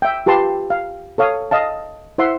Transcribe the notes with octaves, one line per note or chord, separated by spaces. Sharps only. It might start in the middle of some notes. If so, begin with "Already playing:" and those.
E5 G5
F4 G4 B4 A5 C6
F5
A4 C#5 F5 D#6
D#5 F5 A5
E4 C5 E5 F#5 C6